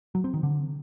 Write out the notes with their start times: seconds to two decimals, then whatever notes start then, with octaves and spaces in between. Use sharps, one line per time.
0.15 F#3
0.24 C4
0.34 D#3
0.43 D3